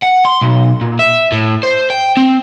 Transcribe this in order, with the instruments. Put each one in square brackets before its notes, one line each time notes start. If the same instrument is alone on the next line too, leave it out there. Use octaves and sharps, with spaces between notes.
[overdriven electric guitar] F#5
C6
B1
A#2
E5
A2
C5
G5
C4